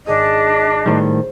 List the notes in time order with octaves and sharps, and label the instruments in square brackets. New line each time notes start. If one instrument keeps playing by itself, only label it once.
[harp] G#1 G#4 D#6 [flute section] D4 [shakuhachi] D#5
[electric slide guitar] A2 D#3 G3 [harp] C5 C#5